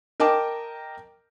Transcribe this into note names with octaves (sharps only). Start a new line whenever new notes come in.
A#4 D#5 G5 A5 D6